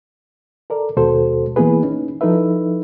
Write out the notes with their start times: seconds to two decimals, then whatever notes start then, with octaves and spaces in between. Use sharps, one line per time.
0.70 A4 A#4 D5
0.97 D#2 B2 G#3 F#4 A4 C5
1.56 E3 A#3 B3 E4 G#4 B4
1.83 C#4 D#4
2.21 F3 D#4 E4 A4 B4 E5